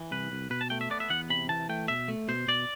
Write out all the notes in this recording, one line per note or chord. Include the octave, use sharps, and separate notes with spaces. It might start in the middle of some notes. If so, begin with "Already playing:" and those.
Already playing: E3
C2 B4
C2
B2 B4
A5
A3 G5
E5
B3 D5
E5
E2 F#5
C3 B5
E3 A5
A3 G5
B2 E5
A3
B2 C5
B2 D5